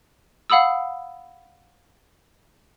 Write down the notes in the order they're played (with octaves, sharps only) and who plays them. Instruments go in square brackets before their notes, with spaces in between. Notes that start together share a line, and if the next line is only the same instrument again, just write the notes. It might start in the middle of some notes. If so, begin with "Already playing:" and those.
[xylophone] F5 F#5 B5 D#6 E6